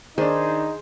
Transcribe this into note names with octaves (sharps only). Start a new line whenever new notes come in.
D#3 D4 D#4 G#4 C5